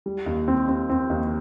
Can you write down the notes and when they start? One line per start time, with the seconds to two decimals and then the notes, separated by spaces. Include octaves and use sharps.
0.06 G3
0.26 D#2
0.48 C4
0.69 C4
0.89 C4
1.10 D#2